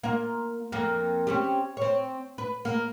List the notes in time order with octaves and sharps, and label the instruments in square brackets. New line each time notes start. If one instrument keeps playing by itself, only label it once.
[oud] A#3 F4
F2 A#3
C4 C#4 G4
C4 C#5
B4
A#3